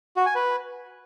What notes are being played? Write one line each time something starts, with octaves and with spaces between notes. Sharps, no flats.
F#4
G#5
B4